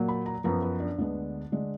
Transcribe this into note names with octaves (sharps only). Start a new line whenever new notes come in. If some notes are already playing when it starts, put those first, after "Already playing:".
Already playing: A#2 F#3 A#3
B5
A#5
F#2 F3 B3 A#5
B4
D4
D2 D3 G#3 B3
D3 G#3